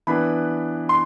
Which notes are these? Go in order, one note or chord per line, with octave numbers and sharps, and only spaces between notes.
E3 B3 D4 B5
C6